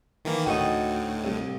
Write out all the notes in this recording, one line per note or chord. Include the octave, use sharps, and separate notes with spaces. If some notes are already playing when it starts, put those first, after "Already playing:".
D#3 E3 A#3
D2 A2 D#4 F#4 D#5 G5
C2